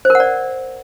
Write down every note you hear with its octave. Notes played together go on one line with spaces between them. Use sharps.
C5
A#4
F#5
D5